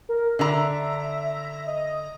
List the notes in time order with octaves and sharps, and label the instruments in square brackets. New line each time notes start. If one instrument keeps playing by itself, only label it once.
[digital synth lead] A#4
[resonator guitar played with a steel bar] D3 A#5 [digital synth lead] E5
[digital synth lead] D#5